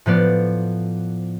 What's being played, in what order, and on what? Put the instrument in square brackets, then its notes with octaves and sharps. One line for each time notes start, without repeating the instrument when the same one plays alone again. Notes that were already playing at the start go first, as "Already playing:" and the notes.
[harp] A2 F3 B3 D5